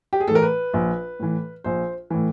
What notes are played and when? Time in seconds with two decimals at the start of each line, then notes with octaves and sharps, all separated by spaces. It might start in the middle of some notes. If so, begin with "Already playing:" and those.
0.13 G4
0.20 G#4
0.27 A2 A4
0.31 E3 A#4
0.42 B4
0.74 A#1
1.20 A2 E3
1.64 A#1 C5
2.10 A2 E3